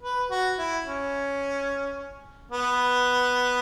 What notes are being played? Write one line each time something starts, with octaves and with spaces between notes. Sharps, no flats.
B4
F#4
E4
C#4
B3